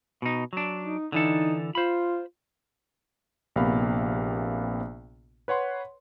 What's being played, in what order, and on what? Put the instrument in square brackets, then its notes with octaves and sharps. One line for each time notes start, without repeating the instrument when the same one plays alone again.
[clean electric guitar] B2 D#4
F#3 D4
[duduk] D#4
[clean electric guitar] D3 E3 A4 [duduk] D#4
[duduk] F4 [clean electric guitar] C5 B5
[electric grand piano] A#1 C3 A#3 B3 F5 B5
B4 C#5 F#5 C6